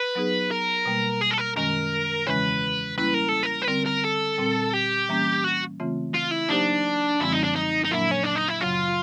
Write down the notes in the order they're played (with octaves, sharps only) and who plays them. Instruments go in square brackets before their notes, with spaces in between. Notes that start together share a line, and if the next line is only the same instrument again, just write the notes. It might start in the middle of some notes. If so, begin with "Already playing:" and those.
Already playing: [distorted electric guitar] B4
[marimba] F#3 B3 D#4 G#4
[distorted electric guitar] A#4
[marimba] B2 G3 A#3
[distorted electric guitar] G#4
A4
A#4
[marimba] F#2 D#3 G#3 C#4 [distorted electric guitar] A#4
[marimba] E2 C#3 E3 G#3 C#4 [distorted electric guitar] B4
[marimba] G3 A#3 C#4 E4 [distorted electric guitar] B4
[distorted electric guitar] A#4
A4
A#4
B4
[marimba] D3 G3 C4 [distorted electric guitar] A#4
[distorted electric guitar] A#4
A4
[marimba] A#2 G3 C4
[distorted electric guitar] G4
[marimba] E3 G3 A#3 C#4
[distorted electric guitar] F#4
[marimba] C#3 E3 A3 C4 F4
[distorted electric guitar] F4
E4
[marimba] F#3 A#3 D#4 G4 C5 [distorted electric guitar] D4
[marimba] F#2 D3 F3 G#3 C4 [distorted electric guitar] E4
[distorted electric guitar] D#4
D4
D#4
D#4
[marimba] A#2 F#3 A#3 D4 [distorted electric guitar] E4
[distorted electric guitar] C#4
D4
D#4
E4
[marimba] F#2 C#3 F#3 [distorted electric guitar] F4